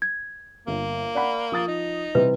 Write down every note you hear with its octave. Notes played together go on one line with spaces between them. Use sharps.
G#6
G1 A#3
D5 F#5 B5
F3 D#6 A6
D#4
C3 E3 G3 B4